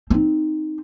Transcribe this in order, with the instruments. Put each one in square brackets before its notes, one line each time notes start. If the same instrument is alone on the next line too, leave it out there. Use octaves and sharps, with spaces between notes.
[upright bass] C4 D#4